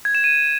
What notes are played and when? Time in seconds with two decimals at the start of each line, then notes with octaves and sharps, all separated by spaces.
0.05 G#6
0.15 E7
0.24 D#7